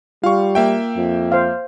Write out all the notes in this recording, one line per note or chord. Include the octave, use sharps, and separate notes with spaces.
G3 F4 F5 C#6
A#3 E5 G5
F2
C5 F5